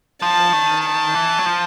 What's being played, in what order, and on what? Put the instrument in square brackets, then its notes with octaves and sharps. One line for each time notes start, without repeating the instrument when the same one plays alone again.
[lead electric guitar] F3 [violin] A5
[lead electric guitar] D#3
[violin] A5
[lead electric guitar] E3
F#3
F3